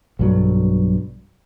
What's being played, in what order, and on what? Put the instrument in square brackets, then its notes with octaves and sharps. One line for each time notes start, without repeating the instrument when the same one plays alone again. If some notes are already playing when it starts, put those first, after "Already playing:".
[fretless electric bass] B1 G2 F#3